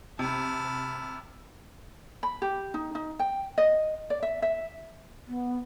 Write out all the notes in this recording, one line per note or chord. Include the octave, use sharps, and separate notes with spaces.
C3 A5 B5 F6
B5
G4
D#4
D#4
G5
D#5
D5
E5
E5
B3